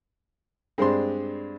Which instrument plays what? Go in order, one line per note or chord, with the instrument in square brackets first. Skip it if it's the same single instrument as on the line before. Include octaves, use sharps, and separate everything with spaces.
[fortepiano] G2 G#3 C4 D4 C6